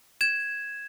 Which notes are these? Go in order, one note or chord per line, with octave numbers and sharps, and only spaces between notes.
G#6 E7